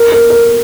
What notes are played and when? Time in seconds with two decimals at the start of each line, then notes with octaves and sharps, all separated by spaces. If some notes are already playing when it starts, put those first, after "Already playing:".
Already playing: A#4
0.12 A#4
0.30 A#4